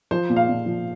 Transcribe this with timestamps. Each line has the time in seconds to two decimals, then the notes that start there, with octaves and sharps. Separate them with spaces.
0.11 F3 C5
0.30 A#2
0.36 F5
0.49 A#2
0.66 F3